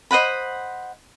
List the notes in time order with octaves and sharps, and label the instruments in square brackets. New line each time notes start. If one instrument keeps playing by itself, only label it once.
[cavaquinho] C5 D#5 F#5 B5